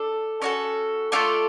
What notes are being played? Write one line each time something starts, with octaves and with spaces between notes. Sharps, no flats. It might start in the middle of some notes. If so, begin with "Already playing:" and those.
Already playing: D4 A4
C#4 F#4 A4 D5
A3 C4 F4 A4 D5